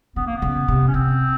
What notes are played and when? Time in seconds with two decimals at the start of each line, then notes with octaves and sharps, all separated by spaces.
0.16 D3 B3
0.27 A#3
0.36 B3
0.42 C#3
0.68 C3
0.87 C#4
0.94 C3 C4